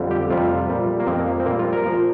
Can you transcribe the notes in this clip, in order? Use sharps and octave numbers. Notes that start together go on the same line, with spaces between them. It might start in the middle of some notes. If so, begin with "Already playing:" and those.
Already playing: F2 D3 G3
G4
F2 C3 G3 F4
A#2 G3
A#3
F2 F3 C4
A#3
C4
A#2 G3 A#3
F4
A#4
A#2 F3